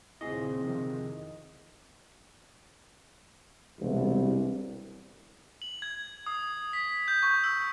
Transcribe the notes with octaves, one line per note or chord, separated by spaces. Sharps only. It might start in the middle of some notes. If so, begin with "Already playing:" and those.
D#2 A#2 C#3 C4 E4 G#4 D#5
F2 C3 D#3
E1 C2
F#7
G#6
D#6
B6
G6
C#6
E6